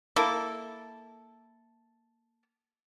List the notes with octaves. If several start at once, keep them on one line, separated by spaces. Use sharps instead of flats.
A#3 E4 A4